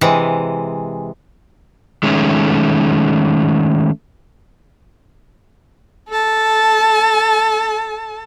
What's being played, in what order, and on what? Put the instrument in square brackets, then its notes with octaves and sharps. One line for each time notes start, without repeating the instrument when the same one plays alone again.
[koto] C3 E3 G#3
[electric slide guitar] D#3 G#3 A3 C#4
[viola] A4 A5